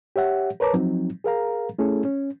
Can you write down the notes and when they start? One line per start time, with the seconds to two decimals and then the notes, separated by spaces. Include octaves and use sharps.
0.16 G4 C#5 E5 F#5
0.60 A#4 B4 C#5 A5 A#5 D6
0.73 F3 F#3 C4 D#4
1.24 G#4 A#4 F5 A#5
1.79 A3 C#4 E4 G#4 A4
2.05 C#4